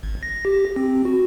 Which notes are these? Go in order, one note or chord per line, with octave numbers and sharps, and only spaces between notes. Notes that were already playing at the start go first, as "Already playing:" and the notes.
G#1
A#6
G4
C4
F#4